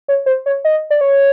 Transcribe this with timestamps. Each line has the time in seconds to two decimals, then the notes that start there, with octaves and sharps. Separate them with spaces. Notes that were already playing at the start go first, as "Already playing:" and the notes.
0.08 C#5
0.26 C5
0.46 C#5
0.65 D#5
0.90 D5
1.01 C#5